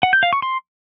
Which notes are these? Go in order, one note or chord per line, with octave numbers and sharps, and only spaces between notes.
F#5
G6
F5
C#6
C6